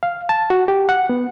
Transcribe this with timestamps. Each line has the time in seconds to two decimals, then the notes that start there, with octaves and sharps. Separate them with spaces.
0.03 F5
0.29 A5
0.50 F#4
0.68 G4
0.89 F#5
1.09 B3